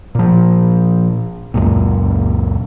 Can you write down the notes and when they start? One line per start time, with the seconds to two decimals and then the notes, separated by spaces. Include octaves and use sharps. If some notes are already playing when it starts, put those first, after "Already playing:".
0.15 A#2 F3
1.54 C#2 F#2 A#2